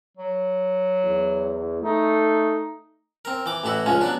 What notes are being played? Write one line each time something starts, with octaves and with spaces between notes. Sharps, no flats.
F#3
E2
A3 D#4
C4 A#4
E3 D6
A1 E3 E4 F#4
C#2 F3 G#3 C#4
F#3 B3 D4